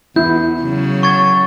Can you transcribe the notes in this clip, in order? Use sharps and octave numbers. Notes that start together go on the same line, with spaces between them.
E2 E4 G6
C#3 F#3
C#6 G#6 A6